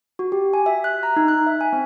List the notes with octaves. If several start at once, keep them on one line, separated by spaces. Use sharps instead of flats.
F#4
G4
G#5
E5
F#6
A#5
D#4
F#6
E5
G#5
C4